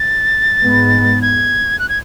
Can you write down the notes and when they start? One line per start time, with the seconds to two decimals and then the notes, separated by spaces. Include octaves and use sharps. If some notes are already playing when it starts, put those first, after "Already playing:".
Already playing: A6
0.62 G#2 G#3 B3
1.22 G#6
1.79 F#6
1.89 G#6